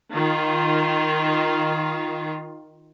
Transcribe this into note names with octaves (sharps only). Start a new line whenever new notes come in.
D#3 F4